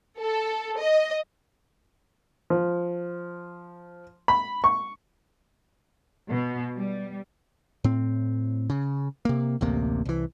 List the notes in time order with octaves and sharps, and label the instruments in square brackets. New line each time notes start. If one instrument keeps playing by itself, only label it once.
[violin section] A4
D#5
[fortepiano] F3
B5
C#6
[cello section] B2
G3
[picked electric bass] A2 C4
C#3
C3 A#3
A1 D2 C3 A#3
C2 E3